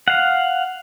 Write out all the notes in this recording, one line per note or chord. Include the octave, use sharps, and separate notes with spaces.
F5 F#5